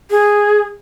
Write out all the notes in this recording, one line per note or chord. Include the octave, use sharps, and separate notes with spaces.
G#4